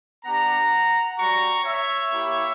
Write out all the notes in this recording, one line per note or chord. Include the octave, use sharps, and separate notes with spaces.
B3 D4 G4 F#5 A#5
G3 C#4 F#4 A#5 C#6
C#5 E5
A#3 E4 G4